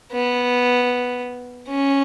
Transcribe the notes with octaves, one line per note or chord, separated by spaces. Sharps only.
B3
C#4